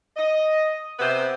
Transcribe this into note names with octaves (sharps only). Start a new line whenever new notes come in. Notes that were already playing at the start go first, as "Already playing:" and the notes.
D#5
C3 B3 B4 C5